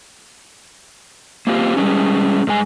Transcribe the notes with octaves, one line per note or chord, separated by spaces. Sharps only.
A#3 C4 F4 G4
G3 G#3 C#4
G2 G#3 G#5